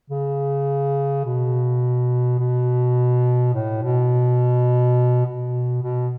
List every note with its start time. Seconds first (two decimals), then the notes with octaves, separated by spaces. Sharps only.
0.10 C#3
1.25 B2
2.39 B2
3.53 A2
3.82 B2
5.26 B2
5.83 B2